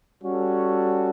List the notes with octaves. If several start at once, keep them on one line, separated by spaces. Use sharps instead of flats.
G3 C#4 F#4 A4